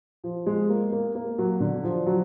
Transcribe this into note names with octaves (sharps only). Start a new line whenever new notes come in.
F3
G#3
A#3
A#3
A#3
F#3
D3
F3
F#3